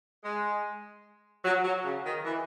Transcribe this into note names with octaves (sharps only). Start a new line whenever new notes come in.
G#3
F#3
F#3
C#3
D#3
E3